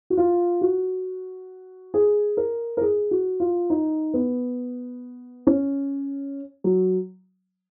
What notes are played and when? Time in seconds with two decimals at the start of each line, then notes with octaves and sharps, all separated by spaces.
0.10 F#4
0.17 F4
0.61 F#4
1.94 G#4
2.37 A#4
2.77 A#4
2.81 G#4
3.11 F#4
3.40 F4
3.70 D#4
4.14 B3
5.47 C#4
6.64 F#3